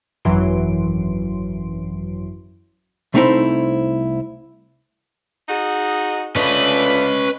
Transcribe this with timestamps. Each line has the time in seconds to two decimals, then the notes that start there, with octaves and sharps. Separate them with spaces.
0.25 G#1 F#2 E3 F#3 C6 D7
3.14 C2 A3 C4 D#4 E4 C5
5.49 D#4 F#4 G#4
6.36 A3 C#4 D4 F4 B4 D#5